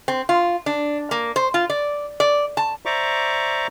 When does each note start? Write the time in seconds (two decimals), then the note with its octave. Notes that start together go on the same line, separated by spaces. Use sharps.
0.08 C4
0.29 F4
0.66 D4
1.11 A#3
1.36 C5
1.54 F4
1.70 D5
2.20 D5
2.57 A5
2.86 C5 D5 E5 A#5 C#6 D6